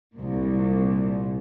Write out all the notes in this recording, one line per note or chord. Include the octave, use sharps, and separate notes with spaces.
C2 A#2